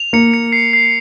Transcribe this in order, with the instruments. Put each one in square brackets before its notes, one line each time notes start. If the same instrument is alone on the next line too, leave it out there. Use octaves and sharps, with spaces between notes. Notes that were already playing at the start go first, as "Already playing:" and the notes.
Already playing: [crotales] F7
[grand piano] A#3 [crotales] C#7
[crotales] C#7
C7
C7